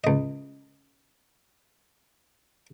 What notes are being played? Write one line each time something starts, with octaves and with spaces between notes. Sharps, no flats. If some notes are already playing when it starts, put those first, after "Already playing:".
C#2 D#5